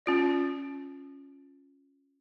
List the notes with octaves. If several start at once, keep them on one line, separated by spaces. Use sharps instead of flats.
C#4 F4 D5